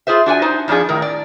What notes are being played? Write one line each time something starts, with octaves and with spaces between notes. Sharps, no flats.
F4 G#4 C5 E5
D4 F#4 F5 G#5
D#4 C5
F2 F3 D4 D#4 G#4
A2 D#3 A#4
D5